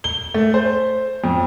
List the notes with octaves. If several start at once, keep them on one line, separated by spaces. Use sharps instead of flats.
G7
A3
C5
F2